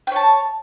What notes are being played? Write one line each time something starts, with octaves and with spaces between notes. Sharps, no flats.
C#5 G5 A5